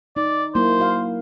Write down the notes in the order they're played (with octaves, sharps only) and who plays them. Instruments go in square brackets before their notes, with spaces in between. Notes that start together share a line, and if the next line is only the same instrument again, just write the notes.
[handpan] D#4 [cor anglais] D5
[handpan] F#3 A#3 E4 [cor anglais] C5
[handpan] F#4 F5